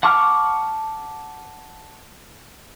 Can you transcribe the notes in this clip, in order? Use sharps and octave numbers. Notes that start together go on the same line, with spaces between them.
F#5 A5 C#6 D6 F6